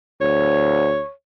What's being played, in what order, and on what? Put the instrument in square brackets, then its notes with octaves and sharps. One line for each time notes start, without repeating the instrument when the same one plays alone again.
[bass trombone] D2 [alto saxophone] C#5